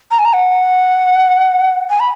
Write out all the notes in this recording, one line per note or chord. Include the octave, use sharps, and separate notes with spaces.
A#5
G#5
A#5
F#5
G#5
B5